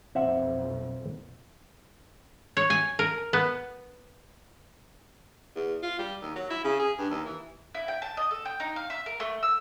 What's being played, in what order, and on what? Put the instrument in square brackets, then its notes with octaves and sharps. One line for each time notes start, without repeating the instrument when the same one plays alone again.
[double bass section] B1 F2 [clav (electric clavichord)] C4 E5 F#5
[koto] C#5
G#5
A#4
B3
[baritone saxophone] E2
F4
G3
D#2
F#3
E4
C#3
G#4
G2
D#2
E3
[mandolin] E4
G5
A5
D#5
A4
G5
D#4
F5
E5
A#4
A3
E6